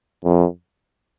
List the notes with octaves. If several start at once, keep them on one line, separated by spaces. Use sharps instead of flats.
F2